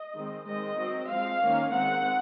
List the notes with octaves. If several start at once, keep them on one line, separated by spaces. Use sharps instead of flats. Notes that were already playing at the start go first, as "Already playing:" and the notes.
Already playing: D#5
D#3 G#3 C4
D#3 G#3 C4 D#5
F#3 C4
F3 G#3 C4 F5
D#3 A#3 C#4
D#3 G#3 C4 F#5